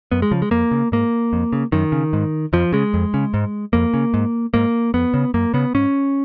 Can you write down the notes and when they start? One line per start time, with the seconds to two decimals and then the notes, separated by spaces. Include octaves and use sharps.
0.12 F#2 B3
0.22 G#3
0.31 C#3 F3
0.42 G#3
0.51 F2 A#3
0.71 C#3
0.92 G#2 A#3
1.33 F2
1.53 C#3
1.72 F#2 D#3
1.92 C#3
2.13 G#2
2.53 F2 F3
2.72 C#3 G#3
2.94 F2
3.14 C#3
3.34 G#2
3.73 F2 A#3
3.94 C#3
4.14 G#2
4.54 G#2 A#3
4.94 F2 B3
5.14 C#3
5.34 F#2 A#3
5.54 C#3 B3
5.74 G#2 C#4